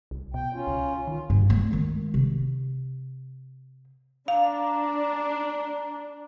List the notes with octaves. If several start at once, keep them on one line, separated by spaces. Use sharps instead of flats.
C2
B2 G5
C#4 F4
C#2
D#3 F4
G2
A3 D4
D#3 G#3
C3
D4 F5 A#5